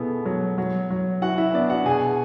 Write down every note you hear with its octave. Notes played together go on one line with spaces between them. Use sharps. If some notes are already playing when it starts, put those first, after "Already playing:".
Already playing: B2 B3 E4 G#4 A4
F#3
F#3
F#3
E4 F#4 F#5
E4 E5
B3 D4 D5
F#4 F#5
B2 G#4 G#5